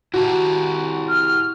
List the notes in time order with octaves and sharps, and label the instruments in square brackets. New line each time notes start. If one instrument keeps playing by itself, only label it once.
[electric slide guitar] E4 G4 A5 [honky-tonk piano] F#4
[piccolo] F6